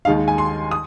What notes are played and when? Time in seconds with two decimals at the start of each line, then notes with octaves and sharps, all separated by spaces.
0.05 D#2 D#3 G#3 D#4 F5
0.28 G#5
0.38 C6
0.71 D#6